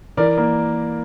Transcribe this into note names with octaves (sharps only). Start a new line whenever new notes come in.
E3 A#4 D5
A#3